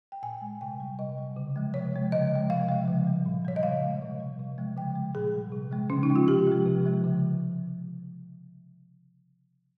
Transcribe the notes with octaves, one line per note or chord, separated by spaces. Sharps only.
G5
A#2 G#5
G#3
C3 G5
G3
C3 D#5
G3
C#3
F3 G#3
C3 C#5
F3 G#3
C#3 D#5
F3 G#3
C3 F5
F3 G#3
C#3
G3
A#2
G3 C#5
D#5
C#3 F5
F3 G#3
C3
G3
C3
F3 G#3
C#3 G5
G#3
A#2 G#4
G3
C3
F3 G#3
C#3 C#4
D#4
F3 G#3
F4
C3 G4
F3
G#3
C3
F3 G#3
C#3